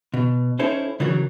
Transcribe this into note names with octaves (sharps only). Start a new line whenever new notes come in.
B2
C#4 D#4 E4 A4 C5 C#5
C#3 E3 F#3 D4 F#4 A#4